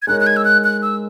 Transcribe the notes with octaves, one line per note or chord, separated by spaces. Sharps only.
G#6
G#3 D#4 A#4 C#5 F#6
F#6
G#6
E6
F#6
F#6
E6